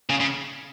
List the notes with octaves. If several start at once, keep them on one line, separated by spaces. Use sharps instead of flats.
C#3
C#3